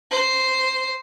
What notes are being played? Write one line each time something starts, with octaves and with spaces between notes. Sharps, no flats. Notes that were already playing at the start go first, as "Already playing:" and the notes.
C5